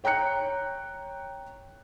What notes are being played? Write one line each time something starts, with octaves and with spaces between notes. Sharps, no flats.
C#5 G5 A#5 F#6 C#7